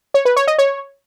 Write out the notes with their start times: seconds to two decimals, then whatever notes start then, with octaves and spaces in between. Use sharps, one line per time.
0.14 C#5
0.25 B4
0.36 C#5
0.47 D#5
0.58 C#5